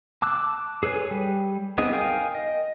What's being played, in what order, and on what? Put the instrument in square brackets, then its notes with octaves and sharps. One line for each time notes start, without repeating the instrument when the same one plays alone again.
[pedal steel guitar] A5 D6 E6 F#6
G#4 A4 B4 C#5 G#5
G3
B3 C4 D#4 G#4 D#5
A#4 F5 G5 G#5 D#6
D#5